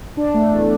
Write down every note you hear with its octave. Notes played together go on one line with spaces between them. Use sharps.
D4
A3
E2